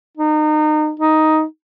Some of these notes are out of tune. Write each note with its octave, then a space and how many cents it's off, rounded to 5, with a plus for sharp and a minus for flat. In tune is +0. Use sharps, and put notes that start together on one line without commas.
D#4 -30
D#4 +5